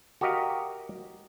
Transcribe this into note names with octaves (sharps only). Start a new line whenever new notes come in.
F#4 G4 A#4 D#5 F5